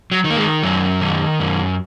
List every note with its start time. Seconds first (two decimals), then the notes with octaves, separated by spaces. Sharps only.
0.12 F#3
0.24 D#3
0.30 A#3
0.37 G#3
0.63 F#2 F#3
1.01 D#3
1.40 F#2